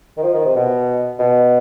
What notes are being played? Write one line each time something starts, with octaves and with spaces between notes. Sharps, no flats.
D#3
F3
D#3
C3
B2
B2